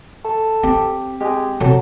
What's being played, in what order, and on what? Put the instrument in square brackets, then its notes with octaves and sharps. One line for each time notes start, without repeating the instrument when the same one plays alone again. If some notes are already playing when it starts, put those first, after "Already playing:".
[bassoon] A4
[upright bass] C4 [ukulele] G4
[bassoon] G#3 [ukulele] G4 G#5
[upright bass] C3 C4 [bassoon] F#3 [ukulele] A4